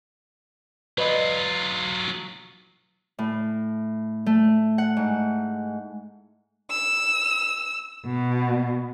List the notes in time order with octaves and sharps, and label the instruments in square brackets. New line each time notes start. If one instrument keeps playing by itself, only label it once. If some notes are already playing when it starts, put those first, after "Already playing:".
[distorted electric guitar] F#3 F4 [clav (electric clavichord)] B4 D5 D#5
[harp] A2
A3
F#5
G#2
[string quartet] E6
B2